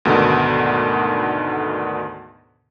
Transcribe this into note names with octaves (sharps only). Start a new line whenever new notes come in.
D2 G#2 B2 D3 D#3